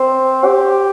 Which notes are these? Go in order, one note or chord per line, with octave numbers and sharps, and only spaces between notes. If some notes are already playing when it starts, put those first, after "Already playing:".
Already playing: C4
G4